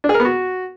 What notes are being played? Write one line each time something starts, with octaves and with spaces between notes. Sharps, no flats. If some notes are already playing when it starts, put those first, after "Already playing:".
D4
G#4
A#4
B3
F#4